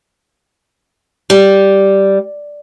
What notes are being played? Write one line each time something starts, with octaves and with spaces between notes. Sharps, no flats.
G3